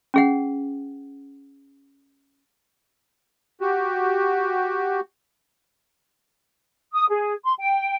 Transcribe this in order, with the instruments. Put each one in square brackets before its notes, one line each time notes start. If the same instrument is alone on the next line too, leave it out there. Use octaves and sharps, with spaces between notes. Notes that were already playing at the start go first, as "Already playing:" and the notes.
[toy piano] C#4 G#4 F#5
[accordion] F#4 G4
[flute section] D#6
G#4
C6
G5